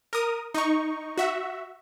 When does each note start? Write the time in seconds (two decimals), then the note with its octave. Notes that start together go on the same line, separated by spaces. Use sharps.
0.13 A#4 D#6
0.54 D#4 C#6
1.17 F#4 E5